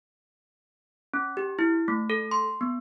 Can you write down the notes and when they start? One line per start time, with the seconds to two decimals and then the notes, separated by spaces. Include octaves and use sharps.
1.14 C#4
1.37 G4
1.59 E4
1.88 A3
2.10 A4
2.31 C6
2.61 B3